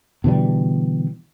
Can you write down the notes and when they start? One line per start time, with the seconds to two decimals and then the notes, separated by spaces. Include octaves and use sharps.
0.24 B2 D3 E3 G3